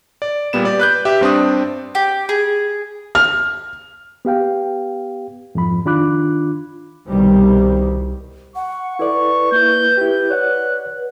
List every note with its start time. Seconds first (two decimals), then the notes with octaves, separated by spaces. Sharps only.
0.22 D5
0.53 A#2 G3 B3 E7
0.65 G4 D5
0.79 B4 F#6 G6
1.05 G4 E5
1.21 G2 C4 D4 D#6
1.95 G4
2.29 G#4
3.15 F6
4.25 B3 G4 F5 G5
5.55 F2 G#2 F3 B5
5.85 D#3 D4 F4 B5 D6 F#6
7.07 C2 B2 D#3 G3
8.56 F#5 C#6
8.99 E4 A4 B4 D5
9.52 A#3 E4 G6
9.97 E4 G4
10.30 C#5 D5 F#5 F#6